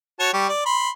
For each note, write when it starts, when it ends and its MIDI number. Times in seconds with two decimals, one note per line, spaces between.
0.20 0.30 66
0.20 0.30 73
0.20 0.30 81
0.33 0.47 55
0.33 0.47 67
0.33 0.47 85
0.49 0.63 74
0.66 0.90 83
0.66 0.90 84